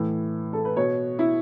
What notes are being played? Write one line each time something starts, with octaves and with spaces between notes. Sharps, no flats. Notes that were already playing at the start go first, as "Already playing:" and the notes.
Already playing: A2 E3
A4
B4
B2 C#5
E4